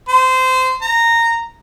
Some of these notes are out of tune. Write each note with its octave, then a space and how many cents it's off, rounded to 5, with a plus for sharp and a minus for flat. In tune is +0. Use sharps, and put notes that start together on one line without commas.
C5 -20
A#5 -15